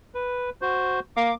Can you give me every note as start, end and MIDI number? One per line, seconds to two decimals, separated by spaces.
0.15 0.50 71
0.62 1.00 66
0.62 1.00 72
1.17 1.32 58
1.17 1.35 86